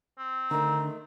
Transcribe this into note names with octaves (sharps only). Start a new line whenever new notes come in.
C4
D3 D#3 A3 A#5